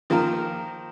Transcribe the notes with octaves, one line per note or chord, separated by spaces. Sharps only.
D#3 F3 A#3 F4 A#4